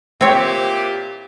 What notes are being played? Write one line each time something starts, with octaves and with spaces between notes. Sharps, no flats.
A#2 C4 E4 G4 C#5